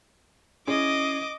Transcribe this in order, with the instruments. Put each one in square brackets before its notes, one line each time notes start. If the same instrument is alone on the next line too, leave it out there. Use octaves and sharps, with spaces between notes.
[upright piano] C#4 E4 G#4 [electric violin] D#5 D6